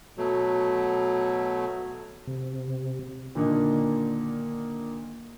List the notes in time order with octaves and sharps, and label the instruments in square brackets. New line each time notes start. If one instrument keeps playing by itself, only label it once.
[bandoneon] B2 F#3 A3
[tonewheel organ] C3
[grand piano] A#2 D3 D#3 A#3 D4 D#4